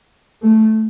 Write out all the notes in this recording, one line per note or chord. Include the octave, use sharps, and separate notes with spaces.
A3